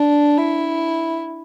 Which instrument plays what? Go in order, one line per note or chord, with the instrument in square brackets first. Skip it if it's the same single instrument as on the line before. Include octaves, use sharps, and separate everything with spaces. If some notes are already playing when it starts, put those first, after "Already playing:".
Already playing: [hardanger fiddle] D4
E4